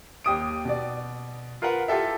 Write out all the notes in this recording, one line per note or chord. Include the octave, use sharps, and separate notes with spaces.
D#2 G4 D#6 D7
B2 D5
F4 A#4 B4 F#5
E4 F4 G4 A4 E5